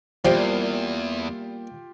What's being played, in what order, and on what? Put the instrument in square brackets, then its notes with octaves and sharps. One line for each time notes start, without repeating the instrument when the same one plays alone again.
[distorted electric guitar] E2 [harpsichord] F3 [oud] G3 A#3 [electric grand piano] F4 G4 G5